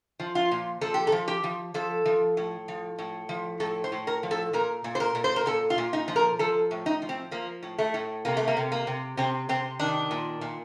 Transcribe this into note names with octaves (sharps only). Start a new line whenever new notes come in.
F3
F4
A#2
F3 A4
G4
A4
F3
G4
F3
F3 A4
F3
A2
F3
A2
F3
A2 A4
C5
A2
A#4
F3
A4
A#2 A#4
A#2
C5
A#4
A#2
C5
A#4
A#2 A4
F4
A#2
D#4
F3
A#4
F3 A4
A2
D#4
F3
C4
F3 A#3
A2
A3
A2
C3 A#3
A3
A#3
C3
A#3
C3
C3 C4
C3 C4
D#3 D4
A#2
A#2